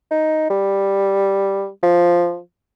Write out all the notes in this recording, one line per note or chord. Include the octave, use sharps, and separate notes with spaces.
D#4
G3
F3